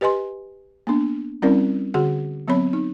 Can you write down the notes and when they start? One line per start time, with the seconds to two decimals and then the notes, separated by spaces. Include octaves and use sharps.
0.01 G4 B4 D#5 G#5 C6
0.87 A#3 B3 D4
1.42 G3 C4 C#4 E4 A#4 D5
1.94 D3 F#4 G#4 F#5
2.48 F#3 B3 C4 C#5 B5
2.73 D#4